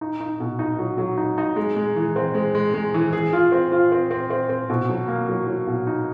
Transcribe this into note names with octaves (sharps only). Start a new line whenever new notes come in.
D#4
D#4
B2
D#4
F#3
F#3
D#4
D#4
G#3
G#3
E3
C4
G#3
G#3
G#3
E3
G#4
F4
C4
F4
C4
C4
C4
C4
B2
F#3
A#3
F#3
F#3
B2
D#4